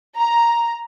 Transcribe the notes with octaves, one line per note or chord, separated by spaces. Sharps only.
A#5